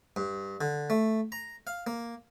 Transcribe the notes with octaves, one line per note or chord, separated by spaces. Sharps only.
G2
D3
A3
A#5
F5
A#3